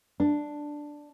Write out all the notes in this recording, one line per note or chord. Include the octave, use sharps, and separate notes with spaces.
D4